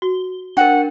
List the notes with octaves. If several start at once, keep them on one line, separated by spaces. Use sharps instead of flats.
F#4 G7
D4 A#4 F#5 G5